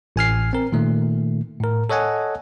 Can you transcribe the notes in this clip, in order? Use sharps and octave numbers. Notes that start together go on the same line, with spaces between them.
A1 G#5 F6 C7
C4 A#4
A#2 D#3 A3
A2 A#4
A4 C#5 D#5 F#5 G#5